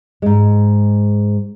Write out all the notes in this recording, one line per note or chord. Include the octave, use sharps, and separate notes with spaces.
G#2 G#3